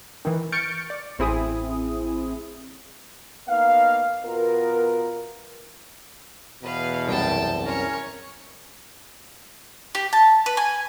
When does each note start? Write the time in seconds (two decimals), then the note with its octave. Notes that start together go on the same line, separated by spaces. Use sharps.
0.25 D#3 E3
0.52 C#6 F6 G6 A6 C#7 D7
0.90 D5
1.19 A1 C4 E4 G#4 D#6
3.49 A#3 B3 D#4 F5
4.24 B2 B3 F4 A#4
6.63 E2 B2 B4 F5
7.08 C2 F#2 G5 A5
7.64 C#4 A#4 C#5
9.95 G4
10.13 A5
10.46 B4
10.57 G#5